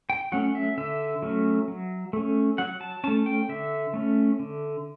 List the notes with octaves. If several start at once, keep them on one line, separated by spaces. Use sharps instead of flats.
G5
F#3 A3 C#4 F#5
E5
D3 E5
F#3 A3 C#4
F#3
A3 C#4
F#3 F#5
A5
A3 C#4 A5
G5
D3 E5
A3 C#4
D3